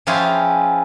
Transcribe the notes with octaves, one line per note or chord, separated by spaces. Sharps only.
F3 C#4 E4 F4 G4 G#4